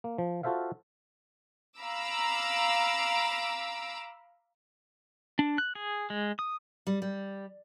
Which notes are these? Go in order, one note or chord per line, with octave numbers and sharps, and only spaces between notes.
A#3
F3
F4 F#4 A4 C5 E5 F5
F5 A#5 B5 D6 E6
D4
F#6
G#4
G#3
D#6
G3
G3